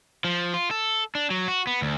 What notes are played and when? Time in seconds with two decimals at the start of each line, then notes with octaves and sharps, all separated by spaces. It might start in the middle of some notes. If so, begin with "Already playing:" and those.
0.25 F3
0.54 F4
0.71 A4
1.15 D4
1.31 F#3
1.48 F#4
1.67 B3
1.82 D2